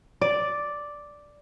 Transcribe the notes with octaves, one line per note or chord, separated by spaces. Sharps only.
D5